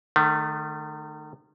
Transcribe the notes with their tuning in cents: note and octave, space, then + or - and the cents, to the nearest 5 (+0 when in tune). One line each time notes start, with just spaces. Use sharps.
D#3 -35 A3 +0